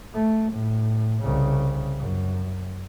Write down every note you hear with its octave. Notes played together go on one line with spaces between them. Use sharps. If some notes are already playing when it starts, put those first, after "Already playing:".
A3
A2
C2 C#3
F#2